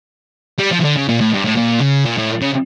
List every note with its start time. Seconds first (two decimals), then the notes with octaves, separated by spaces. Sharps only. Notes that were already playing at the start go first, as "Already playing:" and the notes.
0.59 G3
0.72 F3
0.81 E3
0.84 D3
0.96 C#3
1.09 A#2
1.21 A2
1.33 G2
1.45 A2
1.57 A#2
1.81 C#3
2.06 A#2
2.18 A2
2.42 C#3